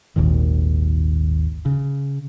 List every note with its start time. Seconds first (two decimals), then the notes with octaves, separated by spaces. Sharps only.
0.16 G#1 D#2 A#2 D#3
1.66 C#3